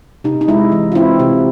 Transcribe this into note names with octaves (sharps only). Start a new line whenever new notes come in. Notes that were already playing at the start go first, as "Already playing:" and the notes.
C3 D#4
D#4
G#3 E4
E3
F4
C4 E4
C3